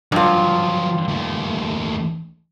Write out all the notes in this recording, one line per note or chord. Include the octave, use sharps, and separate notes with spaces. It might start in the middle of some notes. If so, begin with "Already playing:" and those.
G2 F3 F#3 F4
D#2 A3